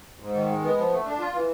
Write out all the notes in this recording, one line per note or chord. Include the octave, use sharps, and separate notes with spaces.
G#2
D#3
G#3
B3
F3
A3
D4
F4
E3